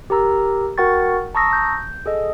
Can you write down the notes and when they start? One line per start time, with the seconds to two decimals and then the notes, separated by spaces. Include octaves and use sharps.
0.10 G4 A#4 A#5 E6
0.78 F#4 A#4 F#5 G5 C#6 A6
1.35 A5 A#5 C#6 D#6 E6 A#6
1.53 G6
2.06 G#4 A4 D#5